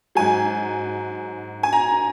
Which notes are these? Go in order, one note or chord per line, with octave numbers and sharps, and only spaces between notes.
G#2 F#3 G#5
G#5
A#5